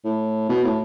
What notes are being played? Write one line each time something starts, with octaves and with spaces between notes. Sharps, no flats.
A2
B2
A2